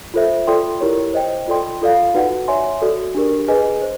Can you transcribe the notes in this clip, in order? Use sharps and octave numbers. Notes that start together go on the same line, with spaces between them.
F4 A4 C5 E5
F4 A4 D5 G5 C6
E4 G4 A#4 C#5
C5 D#5 G5
F4 A4 D5 G5 C6
F4 A4 D5 F5
D#4 F#4 B4 D5 F#5
C#5 E5 G#5 C6
F#4 A4 D5
D4 G4 A#4
G#4 B4 D#5 G#5
C5